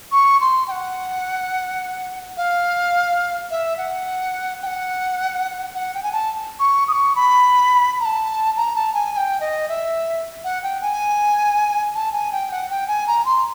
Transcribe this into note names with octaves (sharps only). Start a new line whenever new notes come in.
C#6
C6
G5
F#5
F5
E5
F#5
G5
F#5
F#5
G5
G#5
A5
C#6
D#6
C#6
B5
A#5
A5
A#5
A5
G#5
G#5
G5
D#5
E5
F#5
G5
G#5
A5
G#5
G5
F#5
G5
G#5
A#5
C6